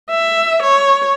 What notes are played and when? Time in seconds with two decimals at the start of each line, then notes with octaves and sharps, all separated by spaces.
0.10 E5
0.62 C#5